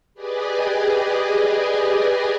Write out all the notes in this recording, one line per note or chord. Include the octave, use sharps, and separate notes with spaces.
G4 G#4 B4 D5 D#5 G#5